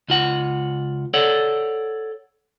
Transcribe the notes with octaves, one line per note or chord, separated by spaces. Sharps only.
C#2 F4 F#5
A4 C#5 D5 F#5